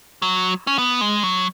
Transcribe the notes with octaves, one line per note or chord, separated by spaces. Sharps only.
F#3
C#4
B3
G#3
F#3